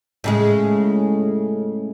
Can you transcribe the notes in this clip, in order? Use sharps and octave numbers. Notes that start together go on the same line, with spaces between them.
A2 C#3 G#3